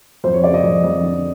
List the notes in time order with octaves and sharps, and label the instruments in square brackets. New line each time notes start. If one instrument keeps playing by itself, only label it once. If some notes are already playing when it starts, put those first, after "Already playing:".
[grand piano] F2 C5
C#5
C#3 D5
D#5
F2
F2
D3